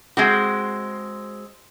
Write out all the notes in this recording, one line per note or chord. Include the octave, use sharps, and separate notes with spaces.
G#3 C4 F#4